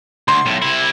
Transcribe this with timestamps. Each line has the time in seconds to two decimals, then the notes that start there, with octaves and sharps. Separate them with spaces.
0.28 D2 C6
0.45 B1 A2
0.62 C3 E4